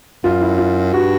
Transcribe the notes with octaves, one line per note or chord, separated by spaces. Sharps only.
F#2 F4
E4
F4
G2 F#4